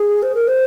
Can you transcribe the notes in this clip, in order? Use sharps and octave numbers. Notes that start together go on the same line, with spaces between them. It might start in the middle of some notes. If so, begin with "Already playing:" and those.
Already playing: G#4
C5
A#4
C5